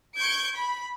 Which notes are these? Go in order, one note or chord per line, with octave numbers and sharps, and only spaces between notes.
C#6 G6 G#6 D7
B5